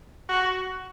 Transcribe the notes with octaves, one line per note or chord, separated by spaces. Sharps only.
F#4